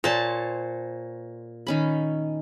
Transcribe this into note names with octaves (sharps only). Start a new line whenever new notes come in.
A#2 C5 C#5 A5
D#3 C#4 B5